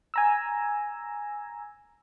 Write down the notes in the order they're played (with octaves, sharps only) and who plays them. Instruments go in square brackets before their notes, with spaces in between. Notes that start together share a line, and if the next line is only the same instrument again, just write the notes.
[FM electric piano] G#5 A#5 E6